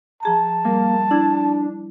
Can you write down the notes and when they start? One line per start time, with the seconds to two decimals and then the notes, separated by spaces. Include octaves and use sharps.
0.23 F3 G#4 A5 A#5
0.65 G3 A#3
1.11 D4 E4 G#6